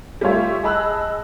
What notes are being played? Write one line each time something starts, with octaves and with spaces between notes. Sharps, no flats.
G3 A3 F4 C#5 E5
G#4 D#5 A5 B5 E6 F#6